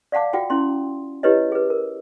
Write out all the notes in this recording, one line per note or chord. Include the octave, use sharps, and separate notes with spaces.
D5 F5 F#5 A5 D6
F4 F#4 F#5 G5
C#4 E4 C6
E4 G4 B4 C#5 D#5
G#4 B4
A#4